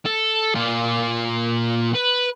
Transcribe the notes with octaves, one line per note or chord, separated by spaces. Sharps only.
A4
A#2 F4
B4